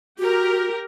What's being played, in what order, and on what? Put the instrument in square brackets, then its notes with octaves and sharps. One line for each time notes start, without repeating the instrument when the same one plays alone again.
[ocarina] F#4 [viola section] G4 A#4